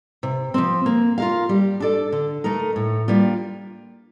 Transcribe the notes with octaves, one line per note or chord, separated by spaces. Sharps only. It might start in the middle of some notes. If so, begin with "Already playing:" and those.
C3
F3 C4
A#3
F4 A#4 F5
G3
D4 A4 D5
D3
A3 D#4 A#4
A2
G3 A#3 D4 F4